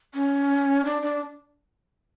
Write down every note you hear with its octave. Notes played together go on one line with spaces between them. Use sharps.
C#4
D4
D4